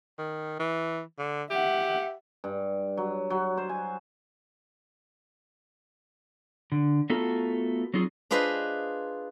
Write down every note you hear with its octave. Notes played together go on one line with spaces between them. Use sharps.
D#3
E3
D3
G4 E5 F#5
G2
F#3
F#3
C5
G#5
D3
A3 B3 F4 F#4 A4 A#4
F#3 C4 D#4 F4 G#4
D4 F4 G#4 B4 C5 D#5